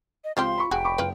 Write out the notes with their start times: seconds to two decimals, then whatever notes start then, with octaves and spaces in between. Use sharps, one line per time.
0.24 D#5
0.37 C#2 F3 C4 F4 G4 C6
0.58 B5 C#6
0.71 F1 F#4 G#4 G5
0.84 B5 C#6 D6
0.98 F#1 F4 B4